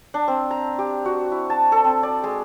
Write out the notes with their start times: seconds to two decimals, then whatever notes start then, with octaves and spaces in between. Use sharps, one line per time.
0.14 D4
0.28 C4
0.51 A#5
0.78 G4
1.05 F#4
1.31 E4
1.50 A5
1.72 A4
1.84 C4
2.03 D5
2.24 G#3